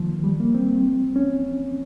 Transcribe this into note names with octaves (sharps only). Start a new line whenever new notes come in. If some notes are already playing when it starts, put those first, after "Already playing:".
Already playing: D#3 F3
G3
A#3
C4
C#4